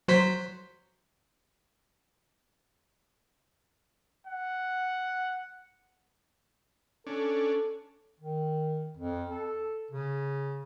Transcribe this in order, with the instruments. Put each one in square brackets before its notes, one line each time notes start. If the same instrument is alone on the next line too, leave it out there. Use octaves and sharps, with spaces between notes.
[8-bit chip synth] F#3 C5 B6
[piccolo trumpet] F#5
[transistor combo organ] C#4 D4 [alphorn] A4
[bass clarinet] D#3
F2
A4
C#3